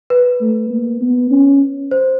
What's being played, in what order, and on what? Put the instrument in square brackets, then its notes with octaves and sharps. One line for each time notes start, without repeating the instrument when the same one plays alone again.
[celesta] B4
[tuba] A3
A#3
B3
C#4
[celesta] C5